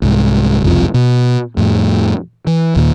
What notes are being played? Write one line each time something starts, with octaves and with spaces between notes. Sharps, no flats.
C2 G#2
F#1 C2 F2 F3
B2
F2 A2
E3
D#2 A#2